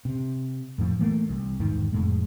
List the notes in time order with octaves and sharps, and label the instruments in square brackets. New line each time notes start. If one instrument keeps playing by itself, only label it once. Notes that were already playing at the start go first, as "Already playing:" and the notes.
[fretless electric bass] C3
F2 A2 F3
E3 A3 A#3
C2
G1 E2 G#2 D#3
F1 F2 A2 G#3